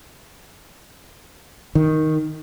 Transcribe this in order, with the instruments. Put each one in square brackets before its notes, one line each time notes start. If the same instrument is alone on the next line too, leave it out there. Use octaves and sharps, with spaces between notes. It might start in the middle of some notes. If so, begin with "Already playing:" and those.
[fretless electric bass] D#3